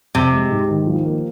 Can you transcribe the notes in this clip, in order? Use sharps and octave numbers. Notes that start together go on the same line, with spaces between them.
F2 C3
G#3
G#2
D#3
F3
A#3